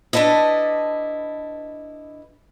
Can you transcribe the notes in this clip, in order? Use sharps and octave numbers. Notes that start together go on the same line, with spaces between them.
D4 E4 A4 B4 D#5